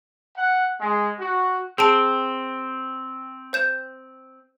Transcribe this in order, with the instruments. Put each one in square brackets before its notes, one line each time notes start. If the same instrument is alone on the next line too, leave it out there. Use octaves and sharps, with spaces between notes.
[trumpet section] F#5
G#3
F#4
[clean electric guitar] C4 [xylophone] G#4 A5 D7
[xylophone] C5 G6 E7